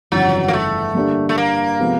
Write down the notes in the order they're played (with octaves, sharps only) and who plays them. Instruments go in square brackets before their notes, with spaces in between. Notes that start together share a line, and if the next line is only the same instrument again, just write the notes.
[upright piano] G1 F2 C#3 E3 [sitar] F#3
[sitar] A#3
A3
[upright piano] G2 D3 G3 A#3 D4
[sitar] A3
A#3
[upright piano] C3 F3 G#3 B3